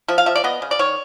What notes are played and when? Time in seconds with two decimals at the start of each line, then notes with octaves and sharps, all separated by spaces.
0.08 F3 E5
0.18 F5
0.26 F3 E5
0.36 D5
0.44 B3 D#5
0.62 C#3
0.71 D5
0.79 D#3 C#5